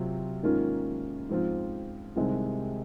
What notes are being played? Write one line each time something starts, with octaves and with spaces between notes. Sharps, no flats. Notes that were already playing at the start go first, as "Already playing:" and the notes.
Already playing: C3 F#3 C4 F4
G#2 D#3 A#3 C#4 F4
G#2 F3 C4 F4
C2 C3 D#3 G#3 C4